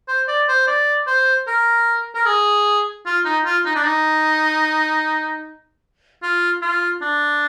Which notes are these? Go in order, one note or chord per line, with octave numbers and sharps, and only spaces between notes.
C5
D5
C5
D5
C5
A#4
A#4
G#4
F4
D#4
F4
D#4
D4
D#4
F4
F4
D4